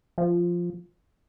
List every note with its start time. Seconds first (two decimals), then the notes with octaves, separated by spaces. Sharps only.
0.18 F3